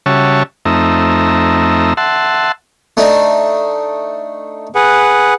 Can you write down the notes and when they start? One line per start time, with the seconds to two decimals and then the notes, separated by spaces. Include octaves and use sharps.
0.06 C#3 G3 F#4 C#5 E5 A5
0.65 F2 A3 C4 D#4 E5 A#5
1.97 E5 F#5 A5 C6
2.97 A3 D4 D#4
4.75 G#4 B4 F#5